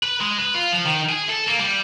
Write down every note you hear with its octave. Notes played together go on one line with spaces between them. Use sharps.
B4
G#3
B4
F4
F3
D#3
G#4
A4
A#3
G3